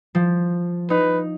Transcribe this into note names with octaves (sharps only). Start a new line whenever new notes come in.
F3
D#4 B4